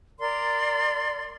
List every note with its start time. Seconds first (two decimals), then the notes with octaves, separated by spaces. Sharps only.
0.20 A#4 D5 C6